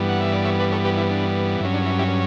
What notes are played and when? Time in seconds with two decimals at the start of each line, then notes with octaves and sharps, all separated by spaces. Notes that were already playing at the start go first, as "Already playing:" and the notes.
Already playing: G2 E3 G3 B3
0.09 F#5
0.21 E5
0.33 D5
0.45 C#5 E5
0.60 B4 D5
0.72 A4 C#5
0.85 G4 B4
0.97 E4
1.10 D4
1.61 G2 F#3 C#4 E4
1.74 D4
1.86 E4
1.99 E4 G4